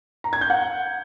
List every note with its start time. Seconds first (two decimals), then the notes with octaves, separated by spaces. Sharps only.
0.24 A#5
0.33 G#6
0.41 G6
0.50 F#5